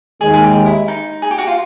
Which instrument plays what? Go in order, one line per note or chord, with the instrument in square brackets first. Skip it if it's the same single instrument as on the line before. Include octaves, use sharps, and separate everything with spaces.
[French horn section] D#2 D#3 G#3 [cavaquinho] G#4
[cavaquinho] G#4
G4
E4
D#4
G#4
G4
F#4
F4